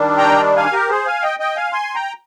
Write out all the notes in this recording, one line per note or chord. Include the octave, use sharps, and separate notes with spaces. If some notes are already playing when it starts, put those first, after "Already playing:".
Already playing: D#3 G3 D4
G5 A#5
F5 G#5
G4 A#4
G#4 C5
F5 G#5
D#5 G5
D#5 G5
F5 G#5
G#5 C6
G5 A#5